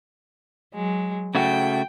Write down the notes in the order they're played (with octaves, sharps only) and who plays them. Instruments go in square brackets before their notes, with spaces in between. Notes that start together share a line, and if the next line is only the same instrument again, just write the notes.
[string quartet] F#3 G#3
[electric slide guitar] C#3 A3 F#4 [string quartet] G5